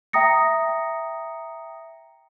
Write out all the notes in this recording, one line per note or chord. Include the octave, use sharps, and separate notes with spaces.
E5 G5 A#5 D#6 A#6 C#7